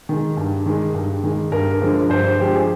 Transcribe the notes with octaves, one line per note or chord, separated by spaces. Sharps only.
D#3 G#3
G2
D#3 G#3
G2
D#3 G#3
G2 A#4
D3 F3 G#3
G2 C5
D3 F3 G#3 G4
G#4